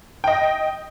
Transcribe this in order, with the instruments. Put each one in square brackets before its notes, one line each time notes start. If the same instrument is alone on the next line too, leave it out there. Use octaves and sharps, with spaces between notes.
[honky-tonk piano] D#5 G5